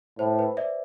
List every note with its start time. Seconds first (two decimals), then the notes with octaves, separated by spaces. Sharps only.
0.19 A2 C5
0.39 B4
0.57 D5 E5